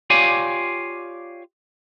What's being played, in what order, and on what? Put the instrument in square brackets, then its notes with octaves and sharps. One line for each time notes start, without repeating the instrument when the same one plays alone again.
[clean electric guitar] F4 G4 C#5 D5 F5 G#5